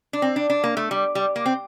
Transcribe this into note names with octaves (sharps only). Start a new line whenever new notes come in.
D4
C4
D4
D4
A#3
A3
G3
G3
A#3
C4